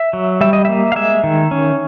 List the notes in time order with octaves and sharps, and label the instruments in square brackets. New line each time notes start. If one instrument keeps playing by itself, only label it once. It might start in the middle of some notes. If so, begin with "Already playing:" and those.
Already playing: [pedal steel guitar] E5
F#3
G3 E5
D#5
A#3 E5
F5
G#3 E5
D#3
C#4